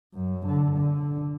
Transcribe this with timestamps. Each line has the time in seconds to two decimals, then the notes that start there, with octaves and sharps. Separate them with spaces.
0.14 F#2
0.46 D3
0.77 D3